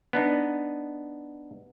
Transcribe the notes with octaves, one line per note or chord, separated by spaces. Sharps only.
B3 D4 D#4